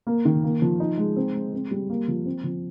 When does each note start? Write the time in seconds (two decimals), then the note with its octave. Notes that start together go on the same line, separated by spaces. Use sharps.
0.07 A#3
0.25 D#3
0.44 A#3
0.62 F3
0.80 D#4
0.98 G#3
1.16 C4
1.34 G#3
1.54 C4
1.71 G3
1.90 A#3
2.08 F3
2.26 C4
2.44 F3